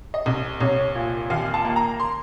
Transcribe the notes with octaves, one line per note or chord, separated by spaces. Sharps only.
D#5
C2
C2 C#5
A#2
D#2 F5
A5
A#3
A#5
C6